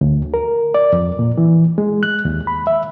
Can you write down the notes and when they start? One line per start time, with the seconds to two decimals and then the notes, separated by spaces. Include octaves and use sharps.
0.01 D2
0.34 A#4
0.74 D5
0.93 F2
1.19 A#2
1.38 E3
1.78 G#3
2.03 F#6
2.25 D#2
2.47 B5
2.67 E5